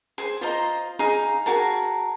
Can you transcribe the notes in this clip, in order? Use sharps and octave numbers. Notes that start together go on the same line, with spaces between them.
G#4 C5
F4 C5 D#5 A#5
D#4 G#4 F5 A#5
F#4 G#4 A#4 A5